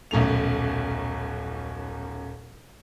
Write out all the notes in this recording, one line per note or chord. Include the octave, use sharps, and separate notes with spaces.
D#1 B1 F#2 A3 F7